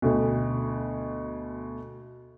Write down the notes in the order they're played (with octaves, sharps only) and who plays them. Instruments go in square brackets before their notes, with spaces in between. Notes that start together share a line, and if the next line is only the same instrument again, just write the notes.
[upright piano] D2 B2